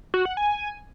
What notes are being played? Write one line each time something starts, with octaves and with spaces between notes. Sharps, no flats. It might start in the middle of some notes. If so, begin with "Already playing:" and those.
F#4
F#5
G#5